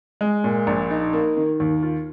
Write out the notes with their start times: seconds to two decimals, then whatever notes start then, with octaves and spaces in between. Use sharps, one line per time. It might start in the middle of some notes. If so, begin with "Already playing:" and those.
0.21 G#3
0.44 A#2
0.67 A#1
0.91 D#4
1.13 A#3
1.37 D#3
1.60 D#2
1.83 F4